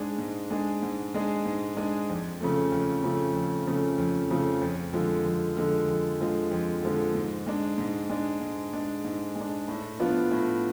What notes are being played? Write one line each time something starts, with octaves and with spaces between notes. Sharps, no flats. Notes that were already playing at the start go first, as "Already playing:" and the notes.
Already playing: G#2 G#3 D4 G#4
G#2
G#3 D4 G#4
G#2
G#3 D4 G#4
G#2
G#3 D4 G#4
F2
C#3 F3 A3
F2
C#3 F3 A3
F2
C#3 F3 A3
F2
C#3 F3 A3
F2
D3 F3 G#3
F2
D3 F3 G#3
F2
D3 F3 G#3
F2
D3 F3 G#3
G#2
G#3 D4
G#2
G#3 D4
G#2
G#3 D4
G#2
G#3 D4
A2
F3 B3 D4 F4
A2